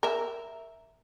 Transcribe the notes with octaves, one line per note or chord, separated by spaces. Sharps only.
A#4 E5